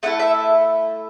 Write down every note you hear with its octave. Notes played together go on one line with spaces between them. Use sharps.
A3 E4 A4 F#5
E5